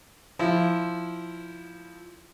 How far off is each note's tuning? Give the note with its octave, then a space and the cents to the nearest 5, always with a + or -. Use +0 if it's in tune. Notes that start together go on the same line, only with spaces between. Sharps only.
F3 +0 E4 +0